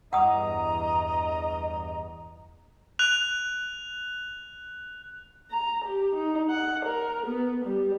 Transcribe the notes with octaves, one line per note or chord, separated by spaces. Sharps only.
E2 G2 D#5 F#5 A#5 D#6
F#6 F7
A#5
G4
D#4
F#5
A#4
B3
G3